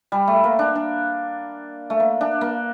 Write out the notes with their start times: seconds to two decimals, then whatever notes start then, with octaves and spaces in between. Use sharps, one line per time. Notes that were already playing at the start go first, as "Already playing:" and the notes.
0.12 G3
0.28 A3
0.44 A#3
0.59 D4
0.75 D4
1.90 A3
2.00 A#3
2.21 D4
2.41 A#3